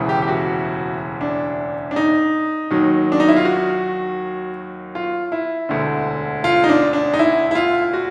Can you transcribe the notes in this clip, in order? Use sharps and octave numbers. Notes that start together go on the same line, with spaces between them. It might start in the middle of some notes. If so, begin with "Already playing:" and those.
Already playing: E1 D2 C#3 E3
G4
G4
F#4
D4
D4
D#4
D#2 D#3 F#3
D4
D#4
E4
F4
F#4
F4
E4
E1 D2 D3
F4
D#4
D4
D4
D#4
E4
E4
F4
F#4